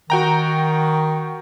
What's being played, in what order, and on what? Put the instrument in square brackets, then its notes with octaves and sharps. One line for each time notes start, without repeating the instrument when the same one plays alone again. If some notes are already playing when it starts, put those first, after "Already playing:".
[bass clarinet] D#3 [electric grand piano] F#4 G5 A#5